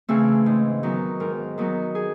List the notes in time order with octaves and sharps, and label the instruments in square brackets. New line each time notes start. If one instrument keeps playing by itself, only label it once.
[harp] C#3 E3 A3 C4
G#2
D#3 F#3 B3
G#2 A#4
D#3 F#3 B3
G#4